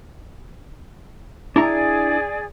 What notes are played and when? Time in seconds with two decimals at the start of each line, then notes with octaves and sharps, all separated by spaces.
1.56 D4 E4 G#4 D5 A#5